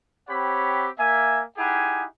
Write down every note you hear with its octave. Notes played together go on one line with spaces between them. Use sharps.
C4 G4 C#5 F#5 B5
A#3 E5 G#5
D#4 E4 G4 G#4 F#5 G#5